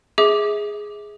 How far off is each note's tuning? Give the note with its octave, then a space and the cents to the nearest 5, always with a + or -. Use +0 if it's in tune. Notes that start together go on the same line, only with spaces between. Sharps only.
G#4 +0 E5 -30 D6 +0